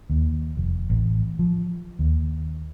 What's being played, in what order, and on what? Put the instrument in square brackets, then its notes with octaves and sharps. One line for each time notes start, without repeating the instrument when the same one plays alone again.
[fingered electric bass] D#2
F1
A1
F3
D#2